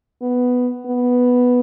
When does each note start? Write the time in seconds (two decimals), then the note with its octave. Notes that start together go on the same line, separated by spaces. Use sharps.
0.22 B3
0.86 B3